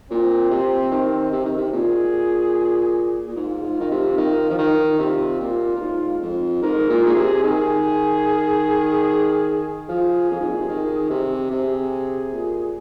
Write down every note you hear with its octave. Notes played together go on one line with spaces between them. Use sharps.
A#2 C4
C3
D#3
C3
D#3
C3
A#2 G#4
A#2
G#2 F4
G#2
D#3
C3
D#3
F3
D#3
C3 F4
A#2
A#2
G#2
F2
G#2 A#4
A#2
A#2 G#4
C3
D#3 G#4
F3 G#4
F2
G#2
A#2
C3
D#3
C3
C3 G#4
A#2